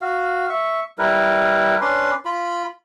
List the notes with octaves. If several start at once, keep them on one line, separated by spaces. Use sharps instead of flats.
F#4 F5
E5 C#6
G3 E4 A#4 B4
C#4 D4 B4 C6
F4 B5